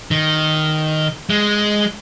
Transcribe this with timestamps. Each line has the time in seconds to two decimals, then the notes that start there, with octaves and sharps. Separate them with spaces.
0.11 D#3
1.30 G#3